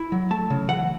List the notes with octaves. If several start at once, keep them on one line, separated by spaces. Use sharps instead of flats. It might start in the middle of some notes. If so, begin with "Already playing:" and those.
Already playing: E4
F#3
A3 A5
C#3
E3 F#5